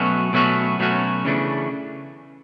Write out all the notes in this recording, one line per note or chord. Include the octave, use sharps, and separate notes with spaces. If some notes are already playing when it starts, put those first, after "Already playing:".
Already playing: B2 F#3 A3 C#4 F#4
B2 F#3 A3 C#4 F#4
B2 F#3 A3 C#4 F#4
C#3 E3 A3 D4